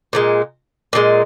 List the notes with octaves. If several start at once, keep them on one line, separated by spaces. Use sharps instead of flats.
A#2 F3 G#3
A#2 F3 G#3